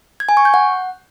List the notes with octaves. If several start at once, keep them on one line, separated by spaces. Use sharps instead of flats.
G#6
G#5
C#6
G6
F#5